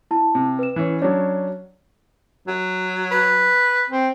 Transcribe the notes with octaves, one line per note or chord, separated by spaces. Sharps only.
E4 A5
C3
B4 E7
E3 C#4
F#3 C#4 D4 C#5
F#3
B4
C4